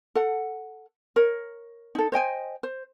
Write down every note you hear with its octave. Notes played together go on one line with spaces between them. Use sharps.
A4 F#5
A#4 C#5
D#4 A4
C5 D#5 G5 G#5
C5